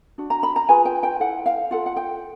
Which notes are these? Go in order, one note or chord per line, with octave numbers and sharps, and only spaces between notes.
D4 F#4
A#5
B5
A#5
F4 G#4 B4 G#5
G5
G5
E4 A4 F#5
F5
F4 A4 F#5
F#5
G5